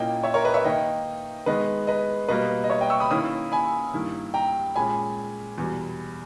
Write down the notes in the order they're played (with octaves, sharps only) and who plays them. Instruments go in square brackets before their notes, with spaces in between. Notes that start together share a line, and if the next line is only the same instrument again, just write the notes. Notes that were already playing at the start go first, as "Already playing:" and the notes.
Already playing: [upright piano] A#2 A#3 C#4 E4 [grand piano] D#5 G5
[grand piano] C#5 E5
A#4 C#5
B4 D#5
C#5 E5
[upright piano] D#3 A#3 D#4 [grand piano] D#5 G5
[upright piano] D#3 G#3 B3 [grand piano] B4 D#5
[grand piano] B4 D#5
[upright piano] B2 G3 A#3 [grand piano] B4 D#5
[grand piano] D#5
C#5 E5
D#5 G5
C#6 E6
B5 D#6
[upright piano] D#3 A#3 C#4 E4 [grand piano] B5 D#6
[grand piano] G#5 B5
[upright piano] G2 D#3 A#3 E4
[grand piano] G5 A#5
[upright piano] A#2 G#3 C#4 [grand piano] G#5 B5
[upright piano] E2 B2 G3